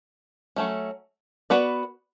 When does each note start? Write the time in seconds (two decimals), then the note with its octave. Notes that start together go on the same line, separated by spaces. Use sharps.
0.56 F#3 A3 C#4
1.50 B3 F#4 B4 D5